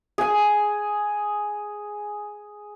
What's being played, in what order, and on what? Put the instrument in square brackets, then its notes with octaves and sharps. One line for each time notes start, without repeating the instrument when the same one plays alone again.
[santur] G#4 G#5